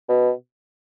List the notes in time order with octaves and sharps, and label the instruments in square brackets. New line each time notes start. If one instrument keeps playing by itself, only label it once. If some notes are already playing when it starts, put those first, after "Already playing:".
[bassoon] B2